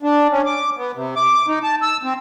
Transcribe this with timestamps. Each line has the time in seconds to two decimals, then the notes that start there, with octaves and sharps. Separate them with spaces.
0.03 D4
0.32 C#4
0.46 D6
0.77 B3
0.96 C3
1.16 D6
1.48 D#4
1.63 A5
1.82 E6
2.03 C4